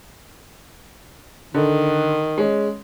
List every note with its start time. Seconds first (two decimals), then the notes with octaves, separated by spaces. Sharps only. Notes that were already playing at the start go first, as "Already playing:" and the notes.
1.54 D3 D#3
2.38 G#3 C#4